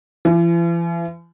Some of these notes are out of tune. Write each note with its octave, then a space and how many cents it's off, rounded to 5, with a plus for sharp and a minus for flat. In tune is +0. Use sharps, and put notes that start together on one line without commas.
E3 +45